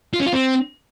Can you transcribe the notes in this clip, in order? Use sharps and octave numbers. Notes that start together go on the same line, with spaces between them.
F4
C#4
F4
C4